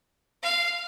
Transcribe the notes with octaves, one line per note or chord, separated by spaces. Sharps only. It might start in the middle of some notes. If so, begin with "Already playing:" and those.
F5